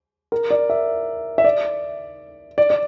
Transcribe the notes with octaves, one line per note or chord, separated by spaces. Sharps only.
A#4
D5
E5
E5
D5
D5
D5